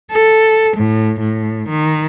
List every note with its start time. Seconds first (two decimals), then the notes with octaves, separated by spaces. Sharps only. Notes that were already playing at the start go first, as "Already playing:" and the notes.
0.13 A4
0.77 A2
1.20 A2
1.69 D#3